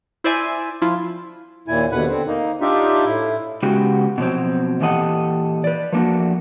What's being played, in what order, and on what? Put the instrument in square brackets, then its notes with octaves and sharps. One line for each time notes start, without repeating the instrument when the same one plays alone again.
[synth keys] E4 C5 D5 E5 G#5
F3 E4 F4
[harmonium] D#2 A#2 E4 G#5
D#2 B2 D3 B4 F#5
D3 C4
A#3 D#4
D4 D#4 F4 G4 E5
A2 E4
[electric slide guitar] C#3 G#3 B3 F#4 G4
B2 F3 F#3 C4
A#2 E3 G4 A4 D#5 F#5
B4 D5
F3 A3 A#3 D4 F#4